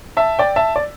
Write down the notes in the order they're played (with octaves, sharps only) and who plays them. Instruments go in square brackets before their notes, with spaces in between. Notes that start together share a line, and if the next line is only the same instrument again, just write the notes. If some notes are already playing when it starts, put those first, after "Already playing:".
[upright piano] E5 A5
D5 G5
E5 A5
D5